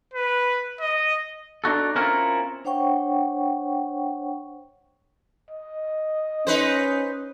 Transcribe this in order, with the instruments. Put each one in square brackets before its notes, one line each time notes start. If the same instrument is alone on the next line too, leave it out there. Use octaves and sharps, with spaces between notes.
[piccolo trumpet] B4
D#5
[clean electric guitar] D4 D#4 F#4 A4
C4 C#4 E4 F4 A#4 C#5
[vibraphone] D4 C5 C#5 F#5 G5 C#6
[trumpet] D#5
[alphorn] C#4 [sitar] D#4 B4 C5